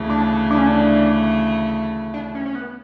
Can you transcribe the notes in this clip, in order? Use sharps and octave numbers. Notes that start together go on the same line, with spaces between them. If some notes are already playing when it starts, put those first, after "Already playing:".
Already playing: D2 C#3 E3 A3
D4
D4
C#4
D4
D4
C#4
C#4
B3